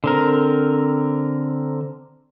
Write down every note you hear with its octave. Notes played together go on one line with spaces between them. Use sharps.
D3 C4 A#4